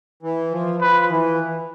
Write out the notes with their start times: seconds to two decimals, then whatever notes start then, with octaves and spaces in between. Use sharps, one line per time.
0.23 E3
0.51 F3
0.80 F3 B4
1.09 E3